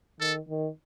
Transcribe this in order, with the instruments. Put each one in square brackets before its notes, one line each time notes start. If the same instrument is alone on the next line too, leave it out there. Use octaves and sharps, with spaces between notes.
[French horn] D#3 [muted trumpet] A4
[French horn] D#3